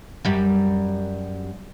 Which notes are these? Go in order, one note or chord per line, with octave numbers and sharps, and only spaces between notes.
F#2 G3